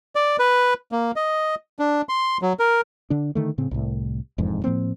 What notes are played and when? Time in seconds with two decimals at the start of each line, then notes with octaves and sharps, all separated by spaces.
0.15 D5
0.39 B4
0.92 A#3
1.16 D#5
1.79 D4
2.09 C6
2.42 F#3
2.59 A#4
3.10 D3 D4
3.35 D3 D#3 A3
3.58 A2 C#3 C4
3.71 C2 A2
4.38 E1 F2 G#2
4.64 A2 F3 A#3 C4